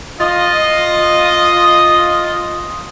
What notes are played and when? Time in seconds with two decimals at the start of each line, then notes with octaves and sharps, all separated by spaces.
0.19 F4 D#5